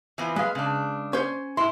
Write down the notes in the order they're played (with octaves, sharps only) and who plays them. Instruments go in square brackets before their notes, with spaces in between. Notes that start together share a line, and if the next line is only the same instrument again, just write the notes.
[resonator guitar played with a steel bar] E3 F3 B3
[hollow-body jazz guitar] G#3 [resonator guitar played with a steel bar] B4 F5
[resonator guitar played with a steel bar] C#3 D4
[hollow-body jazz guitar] C#4 C5
[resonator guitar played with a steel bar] A2 E4 [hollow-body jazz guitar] C6